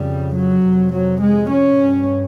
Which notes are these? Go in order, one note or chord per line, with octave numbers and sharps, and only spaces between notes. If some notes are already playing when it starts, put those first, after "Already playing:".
Already playing: F2 C#3 G3
F#3
F2 C3
F#3
G#3
C#4
G2